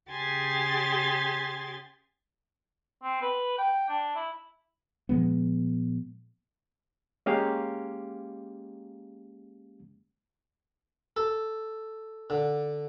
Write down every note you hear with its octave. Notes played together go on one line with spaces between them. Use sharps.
C#3 G4 G#4 G#5 C6 A6
C4
B4
G5
D4
E4
A#2 F3 G#3 B3
G#3 A#3 C#4 G4 F5
A4
D3